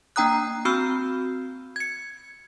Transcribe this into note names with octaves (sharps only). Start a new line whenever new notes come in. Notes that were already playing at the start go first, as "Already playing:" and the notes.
A#3 D4 G5 A#5 D#6 F#6
C4 F#4 B5 E6 F6 G6
G#6 C#7